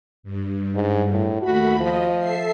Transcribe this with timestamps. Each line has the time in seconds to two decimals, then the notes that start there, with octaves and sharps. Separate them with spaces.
0.23 G2
0.75 G#2
1.11 A2
1.42 D#2 A3 F#4 B5
1.80 F3 D#5
2.18 A4 E5 C7